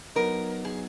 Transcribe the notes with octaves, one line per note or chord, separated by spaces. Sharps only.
F#3 B3 D#4 A#4
G#4